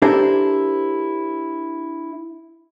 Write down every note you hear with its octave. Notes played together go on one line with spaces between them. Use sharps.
D4 E4 G4 A4 A#4 C5